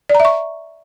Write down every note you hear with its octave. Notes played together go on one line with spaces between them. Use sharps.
D5
A#5
E5
C#6